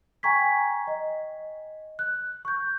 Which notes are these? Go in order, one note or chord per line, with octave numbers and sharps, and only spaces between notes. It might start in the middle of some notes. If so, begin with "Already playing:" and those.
G5 G#5 A#5 C#6 G#6 B6
D#5
F#6
C#6 G6